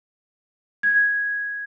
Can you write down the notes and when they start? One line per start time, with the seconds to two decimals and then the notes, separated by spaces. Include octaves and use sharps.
0.83 G#6